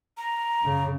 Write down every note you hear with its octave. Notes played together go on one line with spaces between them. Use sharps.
A#5
F#2 C#3